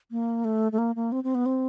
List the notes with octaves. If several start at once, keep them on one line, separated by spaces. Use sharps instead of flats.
A#3
A3
A3
A#3
A#3
C4
C4
B3
C4